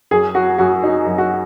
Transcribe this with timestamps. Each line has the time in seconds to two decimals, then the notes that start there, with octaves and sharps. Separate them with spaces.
0.11 F#2 G#4
0.35 F#3 F#4
0.58 F#2 F#4
0.83 F#3 D#4
1.06 F#2
1.18 F#4